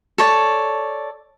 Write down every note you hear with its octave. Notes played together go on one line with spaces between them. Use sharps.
A4 C#5 D5